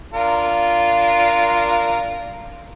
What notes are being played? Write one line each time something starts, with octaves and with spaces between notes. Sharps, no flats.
D4 F4 A#4